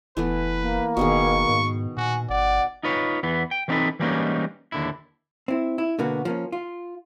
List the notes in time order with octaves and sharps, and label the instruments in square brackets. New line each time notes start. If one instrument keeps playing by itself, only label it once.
[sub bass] F1 [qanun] E3 A3 B3 [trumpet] B4
[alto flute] A#3
[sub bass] F#1 [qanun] B2 D#3 G#4 [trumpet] C#6
[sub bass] G#2
[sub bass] A#2 [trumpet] F#4 [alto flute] G#5
[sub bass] G1 [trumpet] D5 [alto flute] F#5
[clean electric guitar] D#4 F4 B4 C#5
E2 E3 B3
G5
E3 G3 C4 D#4 A4 B4
E3 G3 G#3 A#3 C#4 D#4
D#2 D3 E4
[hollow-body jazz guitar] C4 E4
E4
B2 D3 A#3 B3 F#4
F3 A#3 C#4
F4